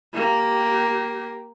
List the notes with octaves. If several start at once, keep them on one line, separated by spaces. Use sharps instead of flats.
A#3 G4